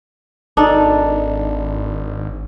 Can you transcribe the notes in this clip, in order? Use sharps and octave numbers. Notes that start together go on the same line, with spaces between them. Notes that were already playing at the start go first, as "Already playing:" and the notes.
G#1 D4 D#4 A4